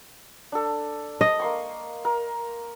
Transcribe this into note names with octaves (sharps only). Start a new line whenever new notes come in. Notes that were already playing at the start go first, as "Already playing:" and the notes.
D4 A4
D#5
A#3 C6 C#6
A#4